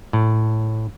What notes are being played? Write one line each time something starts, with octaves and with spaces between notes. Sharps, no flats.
A2